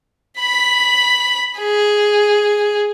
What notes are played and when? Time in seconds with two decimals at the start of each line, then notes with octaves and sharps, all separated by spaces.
0.40 B5 B6
1.59 G#4